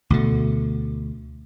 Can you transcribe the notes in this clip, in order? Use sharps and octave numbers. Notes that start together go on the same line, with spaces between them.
D2 B2 D3